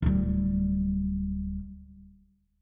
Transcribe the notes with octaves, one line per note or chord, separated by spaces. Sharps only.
D1 G3